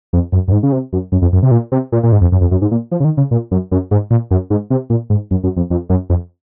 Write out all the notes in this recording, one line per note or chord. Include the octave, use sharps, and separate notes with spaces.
F2
F#2
F#2
G#2
C#3
C3
F#2
F#2
F2
F#2
C3
A#2
C3
A#2
A#2
G#2
F2
F#2
F2
F#2
G#2
A#2
F3
C#3
D#3
C#3
A#2
F#2
F#2
G#2
A#2
F#2
G#2
C3
A#2
G#2
F#2
F#2
F2
F2
F#2
F2